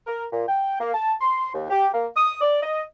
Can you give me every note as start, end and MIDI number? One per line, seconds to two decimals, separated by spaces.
0.07 0.25 70
0.32 0.44 46
0.48 0.80 79
0.80 0.94 58
0.94 1.14 81
1.21 1.52 84
1.54 1.66 39
1.70 1.88 67
1.93 2.07 58
2.16 2.36 87
2.41 2.59 74
2.62 2.83 75